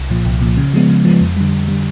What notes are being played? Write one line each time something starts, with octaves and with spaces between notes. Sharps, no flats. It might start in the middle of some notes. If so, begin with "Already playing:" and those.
Already playing: C2
A#2 F3
C2
A#2 F3
C#3
F3 G#3 B3
C#3
F3 G#3 B3
F2
D3 G3
F2
D3 G3